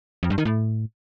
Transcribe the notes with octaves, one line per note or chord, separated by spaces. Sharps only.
F2
G2
D#3
A2